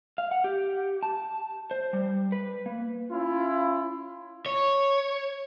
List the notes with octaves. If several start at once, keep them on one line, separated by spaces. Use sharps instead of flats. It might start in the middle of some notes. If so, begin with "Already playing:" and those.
F5
F#5
G4
A5
C5
G3
B4
A#3
C#4 E4 F4
C#5